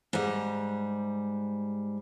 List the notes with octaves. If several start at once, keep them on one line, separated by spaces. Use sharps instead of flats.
G#2 G3